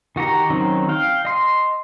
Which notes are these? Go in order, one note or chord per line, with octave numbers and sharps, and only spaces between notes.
D#3 F#4 G4 A#5
D#3 F#3 C4 C#4 D#4
F5 G5
D#5 C6